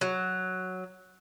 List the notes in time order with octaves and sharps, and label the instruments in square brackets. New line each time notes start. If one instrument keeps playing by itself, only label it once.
[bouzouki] F#3